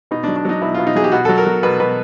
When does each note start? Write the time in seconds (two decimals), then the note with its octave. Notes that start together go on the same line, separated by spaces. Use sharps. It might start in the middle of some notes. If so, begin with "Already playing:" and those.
0.11 B2 D#4
0.24 D4
0.28 F#3
0.36 D4
0.45 F#3 D#4
0.62 B2 E4
0.74 B2 F4
0.87 D#4
0.95 F#3 G#4
1.04 G4
1.12 B2 F#4
1.25 F#3 A4
1.38 A#4
1.46 F#3
1.63 B2 B4
1.80 B2 B4